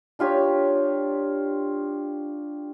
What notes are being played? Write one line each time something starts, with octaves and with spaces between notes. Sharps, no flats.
D4 F4 G4 C#5